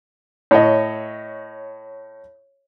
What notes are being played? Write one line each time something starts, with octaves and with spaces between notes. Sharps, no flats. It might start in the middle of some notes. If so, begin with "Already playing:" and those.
A2 C#5 D#5